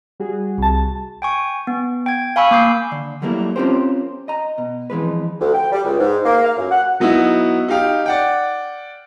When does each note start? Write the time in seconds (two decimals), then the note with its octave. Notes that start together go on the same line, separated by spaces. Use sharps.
0.20 G3 F#4 G#4
0.58 C2 A5
1.22 G5 G#5 C#6
1.67 B3
2.06 G5 G#6
2.36 F5 G#5 B5 C#6 E6
2.51 A#3 D6 G6 C7
2.91 D3
3.22 F#3 G3 A3 A#3 E4
3.56 C4 C#4 F4 G4 A#4 C5
4.28 D#5 A#5
4.58 B2
4.90 F2 E3 G#3 B4
5.40 D2
5.54 G5
5.72 G3
5.84 C#2
5.99 G#2
6.25 A#3
6.44 F5
6.57 F#2
6.70 F#5
7.00 F#3 B3 D#4 E4 F#4
7.68 D#4 G4 F5 G5
8.06 D5 F#5 G5